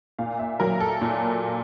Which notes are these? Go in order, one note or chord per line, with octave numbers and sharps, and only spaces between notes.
A#2 F5
E5
F#3 A#4
A4
A#2